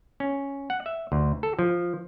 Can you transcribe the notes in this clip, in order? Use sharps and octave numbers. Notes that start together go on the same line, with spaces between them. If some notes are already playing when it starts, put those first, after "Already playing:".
C#4
F#5
E5
D2
A4
F3